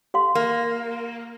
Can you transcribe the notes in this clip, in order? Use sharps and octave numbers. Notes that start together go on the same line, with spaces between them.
G4 F5 C6
A#3